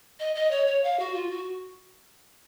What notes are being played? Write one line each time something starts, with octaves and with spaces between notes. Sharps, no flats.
D#5
D#5
C#5
C#5
F5
F#4
F4
F#4